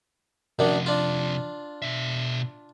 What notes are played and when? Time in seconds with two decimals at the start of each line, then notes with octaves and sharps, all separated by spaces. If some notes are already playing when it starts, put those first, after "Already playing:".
0.59 F#2 C3 D#3 F3 D4
0.86 D4 F4
1.82 B2 E5